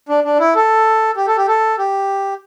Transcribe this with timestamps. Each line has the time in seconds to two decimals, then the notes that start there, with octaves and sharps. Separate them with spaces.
0.09 D4
0.24 D4
0.40 E4
0.55 A4
1.17 G4
1.27 A4
1.37 G4
1.48 A4
1.78 G4